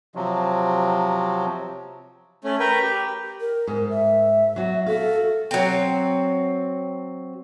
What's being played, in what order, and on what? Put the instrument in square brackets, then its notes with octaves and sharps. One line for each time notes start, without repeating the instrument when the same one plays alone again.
[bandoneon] C3 F3 F#3
[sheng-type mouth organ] A3 C#4
A#4 B4 G5
G4
[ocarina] A#4
[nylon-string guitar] G#2
[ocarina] E5
[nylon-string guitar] F#3 F#4
[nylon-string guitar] F#4 E5 F5 [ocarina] A4
[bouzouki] F#3 C4